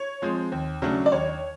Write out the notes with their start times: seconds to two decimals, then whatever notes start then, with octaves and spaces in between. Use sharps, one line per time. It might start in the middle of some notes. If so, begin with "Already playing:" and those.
Already playing: C#5
0.22 F3 G#3 C4
0.52 D#2
0.82 C#3 F#3 A3 D4
1.06 D5
1.12 D#2 C#5